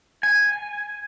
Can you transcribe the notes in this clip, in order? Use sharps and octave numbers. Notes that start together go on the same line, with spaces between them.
G#5